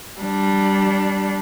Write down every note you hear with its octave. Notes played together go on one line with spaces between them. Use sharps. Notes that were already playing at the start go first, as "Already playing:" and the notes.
G3 D4